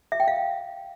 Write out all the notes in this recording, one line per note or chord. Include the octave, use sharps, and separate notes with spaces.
E5
G5
F5